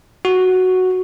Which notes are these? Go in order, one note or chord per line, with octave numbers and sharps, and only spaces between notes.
F#4